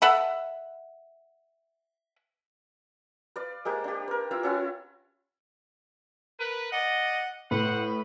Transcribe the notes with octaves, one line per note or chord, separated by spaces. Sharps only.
A4 E5 F#5 B5
B4 D5 F5
G#3 A#3 G4 C5
D4 G4
A#4 B4
E4 F4 E5 F5
C#4 E4 F4 G#5
A#4 B4
D5 D#5 F#5
A2 B4 C5 F#5